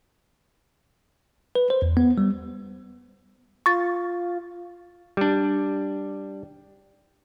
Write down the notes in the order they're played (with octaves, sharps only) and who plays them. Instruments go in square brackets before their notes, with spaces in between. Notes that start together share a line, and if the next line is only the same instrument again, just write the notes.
[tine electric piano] B4
C5
E2
B3
G3
[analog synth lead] F4 [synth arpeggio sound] C#6 A6
[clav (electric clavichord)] G3 D4